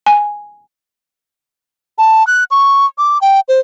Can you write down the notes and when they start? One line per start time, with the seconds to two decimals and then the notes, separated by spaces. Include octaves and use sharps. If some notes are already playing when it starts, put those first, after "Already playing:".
0.06 G#5
1.98 A5
2.27 F#6
2.51 C#6
2.98 D6
3.21 G5
3.48 C5